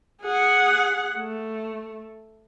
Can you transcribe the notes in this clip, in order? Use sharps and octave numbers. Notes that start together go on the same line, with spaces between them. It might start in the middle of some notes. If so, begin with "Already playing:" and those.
G#4 F#5
A3